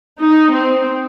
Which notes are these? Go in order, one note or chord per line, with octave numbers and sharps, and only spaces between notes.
D#4
C4